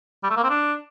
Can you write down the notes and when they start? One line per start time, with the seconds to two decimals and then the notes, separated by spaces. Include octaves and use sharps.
0.23 G3
0.30 A3
0.37 A#3
0.43 C4
0.50 D4